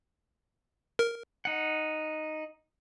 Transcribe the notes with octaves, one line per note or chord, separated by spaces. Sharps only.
A#4
D#4 F#5